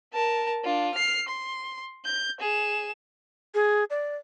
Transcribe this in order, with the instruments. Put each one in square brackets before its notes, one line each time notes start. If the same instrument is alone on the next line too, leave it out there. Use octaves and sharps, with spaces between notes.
[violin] A#4 A5
D4 F4
F6 C7
C6
G6
G#4 E7
[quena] G#4
D5